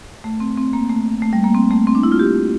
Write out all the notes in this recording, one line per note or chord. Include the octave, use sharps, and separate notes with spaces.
A3
C4
C4
A#3
A3
A3
G3
A#3
C4
A3
C4
D4
E4
F4
G4